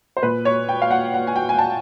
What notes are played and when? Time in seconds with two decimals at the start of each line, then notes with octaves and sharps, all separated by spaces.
0.17 C5
0.23 A#2 B4
0.45 C#5
0.69 G5
0.82 F5
0.91 F#5
1.14 F#5
1.27 G#5
1.36 G5
1.49 G#5
1.59 A5